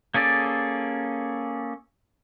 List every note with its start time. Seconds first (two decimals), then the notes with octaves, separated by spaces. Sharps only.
0.14 A#3 C#4 G#4 A4 D5